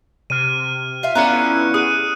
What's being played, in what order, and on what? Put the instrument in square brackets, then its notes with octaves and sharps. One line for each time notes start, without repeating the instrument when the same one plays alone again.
[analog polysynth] C3 [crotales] F6 D#7
[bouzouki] F4 E5 F5
[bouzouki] D3 F4 A#5 [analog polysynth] B3 C#4 E4 [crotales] F#6 C#7
[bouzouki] G#4 [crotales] D#6 F#6 D#7